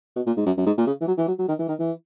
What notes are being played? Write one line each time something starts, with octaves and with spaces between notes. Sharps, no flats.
B2
A#2
G#2
F#2
F#2
G#2
A#2
C#3
E3
F#3
E3
F#3
F#3
D#3
E3
D#3
E3